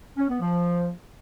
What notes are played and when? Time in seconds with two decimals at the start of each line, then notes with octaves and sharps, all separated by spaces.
0.17 C#4
0.29 B3
0.40 F3